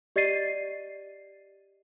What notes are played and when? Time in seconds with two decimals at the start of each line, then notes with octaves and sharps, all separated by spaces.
0.16 G4 D5 D#5 A6 C7 D#7